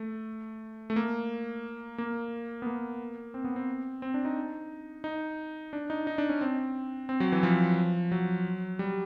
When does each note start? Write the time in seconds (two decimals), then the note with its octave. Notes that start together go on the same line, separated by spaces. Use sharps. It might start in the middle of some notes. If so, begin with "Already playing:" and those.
Already playing: A3
0.90 A3
0.96 A#3
1.98 A#3
2.62 B3
2.67 A#3
3.34 C4
3.44 B3
3.56 C4
4.02 C4
4.14 D4
4.25 D#4
5.04 D#4
5.73 D4
5.90 D#4
6.07 D#4
6.18 D4
6.29 C#4
6.41 C4
7.09 C4
7.20 F#3
7.32 E3
7.43 F3
8.12 F#3
8.79 G3